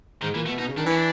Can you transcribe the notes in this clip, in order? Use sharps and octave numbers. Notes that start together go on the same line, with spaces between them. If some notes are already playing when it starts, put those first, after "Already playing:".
G#2 D#3
A#2 E3
B2 A3
B2 D#4
C#3
D#3 D4
E3 C#4
D4